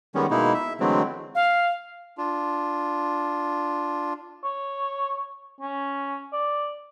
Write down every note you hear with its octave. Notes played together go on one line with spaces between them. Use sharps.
D#3 G3 G#3 B3 C#4
B2 G#3 A#3 D#4 E4
E5
D3 E3 F#3 G#3 A3 C4
F5
D4 F4
C#5
C#4
D5